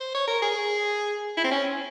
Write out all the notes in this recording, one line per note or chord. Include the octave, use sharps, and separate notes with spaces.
C5
C#5
A#4
G#4
E4
C4
C#4